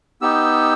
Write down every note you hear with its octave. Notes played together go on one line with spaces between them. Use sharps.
B3 D#4 G4 E6